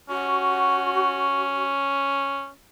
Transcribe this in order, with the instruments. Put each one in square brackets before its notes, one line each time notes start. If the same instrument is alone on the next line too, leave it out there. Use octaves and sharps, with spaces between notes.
[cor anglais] C#4 [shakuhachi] F#4